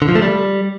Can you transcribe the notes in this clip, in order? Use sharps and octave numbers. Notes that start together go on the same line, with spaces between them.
D3
F3
A3
G3